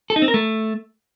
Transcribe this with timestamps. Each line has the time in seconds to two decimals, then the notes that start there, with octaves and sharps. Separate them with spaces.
0.10 A4
0.16 D#4
0.22 C4
0.28 A#4
0.34 A3